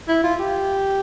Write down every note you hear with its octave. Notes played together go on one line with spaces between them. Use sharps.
E4
F4
G4